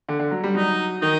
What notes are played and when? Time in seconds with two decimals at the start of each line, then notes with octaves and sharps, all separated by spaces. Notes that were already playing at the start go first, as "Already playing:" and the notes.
0.09 D3
0.19 D3
0.31 F#3
0.44 G3
0.55 F#3 D#4
1.02 D#3 D#4